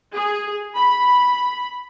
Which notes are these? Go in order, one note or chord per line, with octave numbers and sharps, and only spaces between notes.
G#4
B5